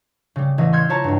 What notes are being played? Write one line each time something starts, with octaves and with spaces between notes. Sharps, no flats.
C#3 G3
A1 E3 D#5
C6 E6 F6 G6 G#6 C#7
E4 F4 C#5 A5 A#5
C#2 G2